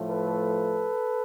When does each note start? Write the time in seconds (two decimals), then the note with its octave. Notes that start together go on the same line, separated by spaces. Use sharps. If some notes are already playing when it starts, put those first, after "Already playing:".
Already playing: A2 F3 A3
0.09 A4 B4